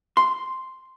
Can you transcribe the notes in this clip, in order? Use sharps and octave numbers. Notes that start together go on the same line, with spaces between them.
C6